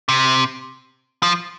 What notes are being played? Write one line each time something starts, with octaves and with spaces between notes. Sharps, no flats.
C3
F3